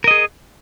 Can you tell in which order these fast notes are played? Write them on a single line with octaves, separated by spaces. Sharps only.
A#4 D#5 G#4